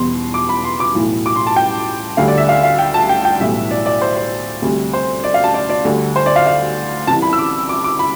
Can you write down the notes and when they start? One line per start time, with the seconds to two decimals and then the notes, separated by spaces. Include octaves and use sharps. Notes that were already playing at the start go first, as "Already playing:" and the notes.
Already playing: E2 B2 G3 C6
0.34 D6
0.49 B5
0.64 C6
0.80 D6
0.94 B1 A2 E3
1.26 D6
1.36 C6
1.47 A5
1.56 G5
2.17 D2 D3 G3 F5
2.28 D5
2.38 E5
2.49 F5
2.63 F5
2.78 G5
2.94 A5
3.09 G5
3.25 G5
3.40 B1 A2 E3 G3 E5
3.71 D5
3.86 D5
4.01 C5
4.16 C5
4.62 D2 C3 G3
4.93 C5
5.24 D5
5.34 F5
5.44 A5
5.54 D5
5.70 D5
5.85 D2 D3 G3
6.16 C5
6.26 D5
6.36 F5
6.47 F5
7.07 C2 C3 E3 A5
7.22 B5
7.33 E6
7.39 D6
7.69 D6
7.84 D6
7.99 B5